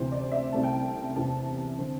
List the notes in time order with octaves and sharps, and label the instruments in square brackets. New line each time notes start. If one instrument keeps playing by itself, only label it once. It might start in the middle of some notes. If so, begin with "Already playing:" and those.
Already playing: [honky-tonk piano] D2 C3 E3 C5
D5
E5
C2 C3 A3 C4 A5
G5
A5
E2 C3 E3 C4 A5
D3 C4